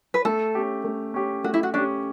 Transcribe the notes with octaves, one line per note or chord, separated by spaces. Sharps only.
B4
A3 A4
C#4 G4
A3
C#4 G4
A3 F#4
E4
F#4
C#4 D4 G4